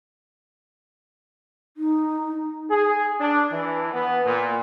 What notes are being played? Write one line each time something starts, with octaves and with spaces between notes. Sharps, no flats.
D#4
G#4
D4
E3
B3
A#2